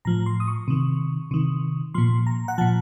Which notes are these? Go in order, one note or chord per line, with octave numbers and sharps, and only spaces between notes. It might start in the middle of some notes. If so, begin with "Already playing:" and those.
A2 F3 A#5
C6
D#6
C#6
C3 D#3
C3 D#3
A#2 F3 C6
A#5
F#5
A#2 F3 A5